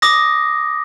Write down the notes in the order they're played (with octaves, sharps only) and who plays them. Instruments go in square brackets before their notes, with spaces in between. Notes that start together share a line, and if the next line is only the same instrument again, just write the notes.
[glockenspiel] D6 D#6 A#6